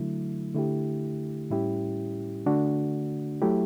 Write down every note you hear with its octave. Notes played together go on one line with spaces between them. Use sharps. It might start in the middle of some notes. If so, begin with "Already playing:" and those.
Already playing: D3 F#3 A3 E4
D3 A3 E4 G4
A2 G3 C#4 E4 G4
D3 A3 D4 F#4
F#3 A3 E4 G4